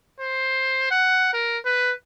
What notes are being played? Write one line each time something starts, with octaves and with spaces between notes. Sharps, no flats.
C5
F#5
A#4
B4